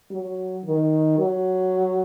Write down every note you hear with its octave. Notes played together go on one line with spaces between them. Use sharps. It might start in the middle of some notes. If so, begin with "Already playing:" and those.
F#3
D#3
F#3